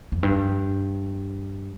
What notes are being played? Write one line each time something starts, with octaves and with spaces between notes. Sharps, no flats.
F2
G2